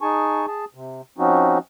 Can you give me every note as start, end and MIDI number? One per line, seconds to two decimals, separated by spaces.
0.01 0.46 63
0.01 0.46 68
0.01 0.46 80
0.01 0.46 81
0.01 0.46 85
0.47 0.65 68
0.47 0.65 81
0.75 1.01 48
1.18 1.58 53
1.18 1.58 60
1.18 1.58 61
1.18 1.58 63
1.18 1.58 66